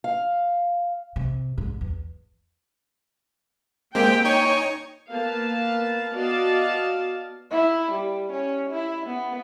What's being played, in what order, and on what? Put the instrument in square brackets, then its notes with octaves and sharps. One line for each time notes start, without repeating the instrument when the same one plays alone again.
[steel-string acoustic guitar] F5
[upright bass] C3
G#2
E2
[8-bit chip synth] G#3 C4 [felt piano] A#3 [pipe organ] G4 [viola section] G5
[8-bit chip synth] D#4 C#5 [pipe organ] G#5 C#6
[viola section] A#3 B3 B4 F5 A5
B3 F#4 D5 D#5 F5 A5
[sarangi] E4
G3
C#4
E4
B3